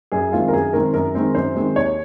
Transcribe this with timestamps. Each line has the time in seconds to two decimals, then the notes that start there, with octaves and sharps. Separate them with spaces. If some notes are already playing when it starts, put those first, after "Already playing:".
0.12 F#2 G#4
0.32 D#3 G#3 C4 F4
0.48 A#4
0.53 F#2 G#4
0.73 D#3 G#3 C4 A#4
0.94 F#2 A#4
1.15 D#3 G#3 C4
1.35 F#2 C5
1.55 D#3 G#3 C4
1.76 D#2 C#5